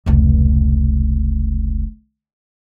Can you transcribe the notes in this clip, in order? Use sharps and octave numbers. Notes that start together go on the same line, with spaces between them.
F1 C#2